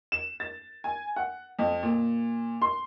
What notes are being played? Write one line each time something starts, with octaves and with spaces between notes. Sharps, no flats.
E7
A6
G#5
F#5
F2
A#2
C6